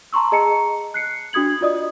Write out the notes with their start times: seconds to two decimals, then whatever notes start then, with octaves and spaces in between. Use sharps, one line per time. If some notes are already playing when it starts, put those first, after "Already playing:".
0.13 A5 A#5 C6 C#6 E6
0.32 G#4 D#5 A5 A#5 C#7
0.94 F#6 C7 C#7
1.33 D4 F#4 D#6 G#6 F#7
1.61 F4 F#4 D5 D#5 D#6